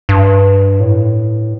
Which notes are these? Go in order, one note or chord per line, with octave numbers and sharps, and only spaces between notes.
G2
A2